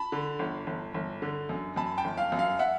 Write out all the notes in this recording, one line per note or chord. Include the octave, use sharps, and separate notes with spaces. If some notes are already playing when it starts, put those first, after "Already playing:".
Already playing: A5 B5
D3
G1
G1
G1
D3
F#2
F#2 A5 B5
G5 A5
G1
F5
F#2
F5
E5 F#5